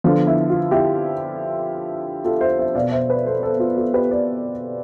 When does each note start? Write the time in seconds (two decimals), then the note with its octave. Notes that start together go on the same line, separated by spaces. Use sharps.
0.04 D3 F3 B3 F4
0.27 E4
0.50 F4
0.71 E4 G4
2.25 F4 A4
2.41 C5 E5
2.59 C5 E5
2.75 B2 D5 F5
2.79 B3
2.92 C5 E5
3.09 B4 D5
3.25 A4 C5
3.43 A4 C5
3.59 F4
3.76 F4 A4
3.93 G4 B4
4.11 B4 D5